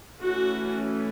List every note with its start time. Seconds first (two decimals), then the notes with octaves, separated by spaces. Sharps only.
0.21 E3 A3 C#4 F#4